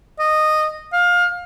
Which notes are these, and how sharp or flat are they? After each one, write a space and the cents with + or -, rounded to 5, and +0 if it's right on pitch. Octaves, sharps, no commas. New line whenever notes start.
D#5 -10
F5 +20